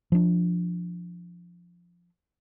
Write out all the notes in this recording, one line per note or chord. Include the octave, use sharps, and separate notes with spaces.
F3 D4